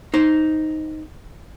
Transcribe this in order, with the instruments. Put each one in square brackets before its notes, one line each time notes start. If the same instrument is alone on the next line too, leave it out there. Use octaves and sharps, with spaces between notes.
[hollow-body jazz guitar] D#4 C5